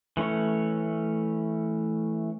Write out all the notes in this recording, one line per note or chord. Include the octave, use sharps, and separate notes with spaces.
E3 A3 C#4 C#5